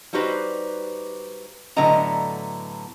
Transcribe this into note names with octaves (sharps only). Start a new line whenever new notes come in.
G3 D#4 F#4 G4 B4 C5
A2 D3 F#3 B3 D#5 A#5